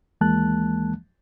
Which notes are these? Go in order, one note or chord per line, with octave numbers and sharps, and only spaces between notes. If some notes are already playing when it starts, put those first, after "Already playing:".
D#2 E3 G#3 A#3 A5 F#6